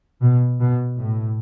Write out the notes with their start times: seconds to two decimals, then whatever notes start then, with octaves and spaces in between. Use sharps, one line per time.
0.22 B2
0.61 B2
0.99 A2